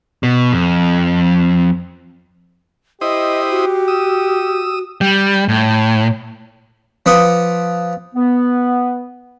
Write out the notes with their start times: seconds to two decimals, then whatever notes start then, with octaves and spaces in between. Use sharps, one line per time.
0.23 B2
0.53 F2
3.01 E4 G4 C5 D#5 D#6
3.51 F#4
3.88 D#6 E6
5.01 G3
5.48 A2
7.06 F3 B4 F#5 D6 D#6
8.15 B3